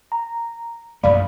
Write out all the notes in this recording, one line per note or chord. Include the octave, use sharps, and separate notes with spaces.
A#5
A#1 F#2 A3 D5 F5 B5